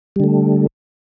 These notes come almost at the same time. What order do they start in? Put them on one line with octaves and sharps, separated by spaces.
G3 D3 A3